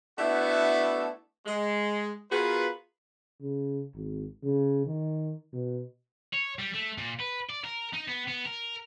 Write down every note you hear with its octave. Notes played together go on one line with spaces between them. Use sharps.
A3 B3 D4 E4 F#4 A4
G#3
B3 F4 F#4 G#4 A#4 B4
C#3
G#1
C#3
D#3
B2
C#5
G3
A3
A#2
B4
D5
A#4
D#4
B3
B3
A#4